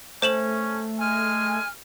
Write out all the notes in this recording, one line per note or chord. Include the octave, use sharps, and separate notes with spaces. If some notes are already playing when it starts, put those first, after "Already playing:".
A3 C#4 C5 E7 F#7
G#3 G#5 F6